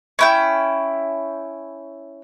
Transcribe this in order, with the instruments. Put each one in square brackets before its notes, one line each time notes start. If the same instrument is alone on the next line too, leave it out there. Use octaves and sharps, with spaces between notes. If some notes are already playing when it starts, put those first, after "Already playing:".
[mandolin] C#4 E4 G5